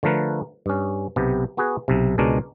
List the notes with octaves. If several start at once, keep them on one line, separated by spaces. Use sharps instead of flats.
D3 F3 A3 A#4 B4
G2 C#4
B1 C3 B3 G4
B3 F#4 G#4 B4
B1 C3
C#2 B2 G#3 D4 A#4 C#5